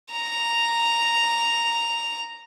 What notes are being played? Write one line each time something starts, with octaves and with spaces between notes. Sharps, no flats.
A#5 F7